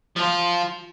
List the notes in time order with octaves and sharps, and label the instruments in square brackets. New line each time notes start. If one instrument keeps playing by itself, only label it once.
[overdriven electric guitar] F3 F4